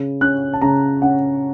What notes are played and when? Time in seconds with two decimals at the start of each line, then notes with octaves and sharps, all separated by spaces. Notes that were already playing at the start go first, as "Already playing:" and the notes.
Already playing: C#3
0.21 C#4 F#6
0.54 A5
0.62 C#3 A#5
1.02 C#4 F#5